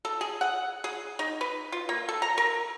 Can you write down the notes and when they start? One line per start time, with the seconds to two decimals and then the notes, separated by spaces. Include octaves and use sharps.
0.05 A4
0.21 G#4
0.41 F#5
0.84 G#4
1.19 D#4
1.41 B4
1.72 F4
1.89 A#3
2.09 A4
2.22 A#5
2.38 A#4